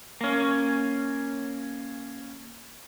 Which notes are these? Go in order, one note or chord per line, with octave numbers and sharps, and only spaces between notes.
A#3 C#4